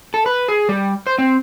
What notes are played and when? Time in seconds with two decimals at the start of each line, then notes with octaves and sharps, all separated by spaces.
0.14 A4
0.26 B4
0.48 G#4
0.69 G3
1.07 C5
1.18 C4